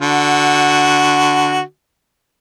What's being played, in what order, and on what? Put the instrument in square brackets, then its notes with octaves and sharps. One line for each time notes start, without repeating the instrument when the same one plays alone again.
[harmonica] D3 F#4